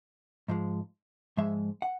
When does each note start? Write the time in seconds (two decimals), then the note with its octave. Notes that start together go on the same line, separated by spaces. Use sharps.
0.48 G#2 F3 G#3
1.37 G#2 F3 G#3 E5
1.82 F#5